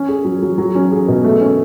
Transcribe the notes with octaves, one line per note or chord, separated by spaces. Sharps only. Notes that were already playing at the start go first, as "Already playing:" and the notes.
Already playing: C#4
G#4
F#3
F#3
F#3
C#4
G#4
B2
A3
C#4